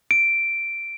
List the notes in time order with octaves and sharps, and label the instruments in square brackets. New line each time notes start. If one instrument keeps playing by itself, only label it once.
[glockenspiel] D7